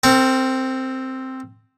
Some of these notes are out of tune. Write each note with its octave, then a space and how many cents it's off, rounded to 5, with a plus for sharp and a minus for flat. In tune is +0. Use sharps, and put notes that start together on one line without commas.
C4 +0 A#4 -45